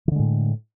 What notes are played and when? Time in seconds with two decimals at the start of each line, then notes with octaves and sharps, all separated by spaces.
0.08 D#3
0.12 D3
0.15 G#3
0.19 A2